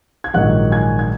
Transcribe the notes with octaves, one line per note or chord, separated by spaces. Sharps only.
G#6
A#1 G#2 D#3 F#3 F#5 F#6
G#5 G#6
G#6